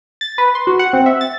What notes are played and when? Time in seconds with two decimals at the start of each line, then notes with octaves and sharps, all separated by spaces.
0.21 A6
0.38 B4
0.55 C6
0.67 F#4
0.79 F#5
0.93 C4
1.06 E5
1.21 A6